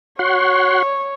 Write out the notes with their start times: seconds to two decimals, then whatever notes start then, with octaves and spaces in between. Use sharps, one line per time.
0.19 F#4 C#5 F#5 C6